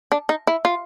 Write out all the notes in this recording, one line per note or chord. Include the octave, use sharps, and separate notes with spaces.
D4
D#4
E4
F4